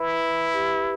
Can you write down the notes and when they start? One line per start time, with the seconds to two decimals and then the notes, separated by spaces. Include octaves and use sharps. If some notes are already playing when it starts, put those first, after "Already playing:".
Already playing: E4 B4
0.54 G4